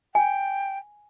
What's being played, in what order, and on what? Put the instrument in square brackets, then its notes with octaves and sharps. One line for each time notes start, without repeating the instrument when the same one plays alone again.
[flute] G5 [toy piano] G#5